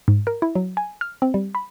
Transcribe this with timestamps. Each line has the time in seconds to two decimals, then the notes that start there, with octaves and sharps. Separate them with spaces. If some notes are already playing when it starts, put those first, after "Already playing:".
0.08 G#2
0.27 A#4
0.42 E4
0.55 F#3
0.77 G#5
1.01 F6
1.22 C4
1.34 G3
1.55 B5